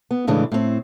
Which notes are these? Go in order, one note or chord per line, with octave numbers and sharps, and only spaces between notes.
B3
A2 C#3 E3 G#3 D4
A2 C4